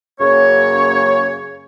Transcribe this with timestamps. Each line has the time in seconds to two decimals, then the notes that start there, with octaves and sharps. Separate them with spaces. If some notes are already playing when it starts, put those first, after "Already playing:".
0.20 F#2 C#3 A#3 C#5